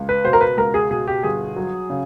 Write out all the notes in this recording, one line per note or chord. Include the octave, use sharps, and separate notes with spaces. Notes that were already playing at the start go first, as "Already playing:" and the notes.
Already playing: C#2
B4
B2 C5
A#4
B4
C#2 A#4
G#4
B2 G#4
G4
G1 G#4
F#3
C#3